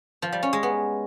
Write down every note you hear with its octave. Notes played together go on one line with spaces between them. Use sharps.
F3
G3
C#4
G#3
B3